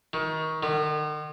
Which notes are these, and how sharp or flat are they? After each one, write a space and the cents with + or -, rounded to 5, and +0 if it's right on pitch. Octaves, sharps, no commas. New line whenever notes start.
D#3 +25
D#3 -45